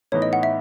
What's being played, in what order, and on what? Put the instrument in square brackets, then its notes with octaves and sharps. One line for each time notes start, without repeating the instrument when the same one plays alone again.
[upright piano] A2 E3 B3 D#4 [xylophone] C#5
[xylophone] D#5
F#5
E5